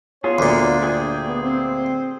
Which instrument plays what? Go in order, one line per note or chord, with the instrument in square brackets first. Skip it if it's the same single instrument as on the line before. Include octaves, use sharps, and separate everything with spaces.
[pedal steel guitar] B3 F4 G#4 [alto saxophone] C#5
[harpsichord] D2 A#2 [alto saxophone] D4
[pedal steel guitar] G#4 G5
[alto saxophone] B3
C4